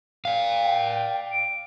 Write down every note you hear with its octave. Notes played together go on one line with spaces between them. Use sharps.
D5 F5
G5
D7